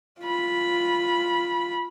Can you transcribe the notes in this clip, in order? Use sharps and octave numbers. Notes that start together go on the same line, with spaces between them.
F4 B5